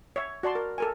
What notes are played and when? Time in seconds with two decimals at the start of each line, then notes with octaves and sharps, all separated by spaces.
0.16 C#5 E5
0.43 F#4 D5 A5 C6
0.55 A#4
0.78 A4 A#4 G#5